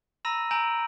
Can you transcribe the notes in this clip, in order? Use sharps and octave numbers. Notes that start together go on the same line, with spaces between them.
A#5 B5 E6 A#6 D#7
G#5 A#5 E6 G6 D7 F#7